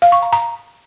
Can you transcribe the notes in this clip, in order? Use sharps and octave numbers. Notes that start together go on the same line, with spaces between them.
F5
C#6
A#5
A#5